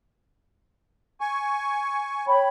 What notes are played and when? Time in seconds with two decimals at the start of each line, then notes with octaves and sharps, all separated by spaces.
1.21 G#5 C#6
2.27 C#5 G5 B5